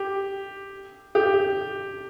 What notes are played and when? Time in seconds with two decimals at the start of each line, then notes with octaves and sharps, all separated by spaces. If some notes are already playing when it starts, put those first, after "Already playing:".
Already playing: G4
1.15 G4